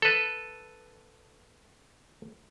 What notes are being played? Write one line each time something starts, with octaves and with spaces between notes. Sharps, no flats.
A4 B4